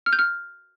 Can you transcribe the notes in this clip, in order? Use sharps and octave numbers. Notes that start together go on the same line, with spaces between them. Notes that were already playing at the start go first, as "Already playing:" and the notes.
F6
G6
F6